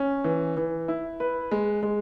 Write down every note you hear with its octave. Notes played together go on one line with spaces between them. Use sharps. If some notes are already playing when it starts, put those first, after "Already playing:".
Already playing: C#4
E3
E3
E4
B4
G#3
G#3